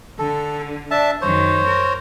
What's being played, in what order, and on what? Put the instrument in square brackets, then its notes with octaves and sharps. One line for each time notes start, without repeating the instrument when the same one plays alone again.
[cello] D3 [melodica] A4
[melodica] D4 E5 A5
[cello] F#2 D#3 [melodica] C5 C#5
[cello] A#4